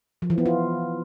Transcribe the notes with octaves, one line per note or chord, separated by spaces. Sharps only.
F3
E3
B3
F4